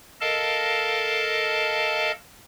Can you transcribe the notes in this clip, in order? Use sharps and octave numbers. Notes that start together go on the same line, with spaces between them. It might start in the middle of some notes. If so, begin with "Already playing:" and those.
A4 A#4 D#5 F5 A5